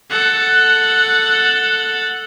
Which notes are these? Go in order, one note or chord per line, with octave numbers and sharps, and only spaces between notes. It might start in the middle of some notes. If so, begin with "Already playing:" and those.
A4 F#5